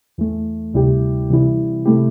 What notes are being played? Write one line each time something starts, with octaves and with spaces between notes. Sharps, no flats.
E2 E3 A3
D2 C3 G3 E4 G4
C3 E3 G3 E4
C3 A3 E4 G4